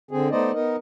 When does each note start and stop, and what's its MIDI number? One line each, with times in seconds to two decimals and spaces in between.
0.11 0.29 50
0.11 0.29 60
0.11 0.29 68
0.31 0.52 57
0.31 0.52 59
0.31 0.52 63
0.31 0.52 72
0.31 0.52 74
0.31 0.52 75
0.54 0.76 59
0.54 0.76 63
0.54 0.76 70
0.54 0.76 75